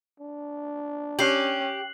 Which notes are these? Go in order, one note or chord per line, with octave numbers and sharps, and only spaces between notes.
D4
C#4 G4 F#6 C7 F#7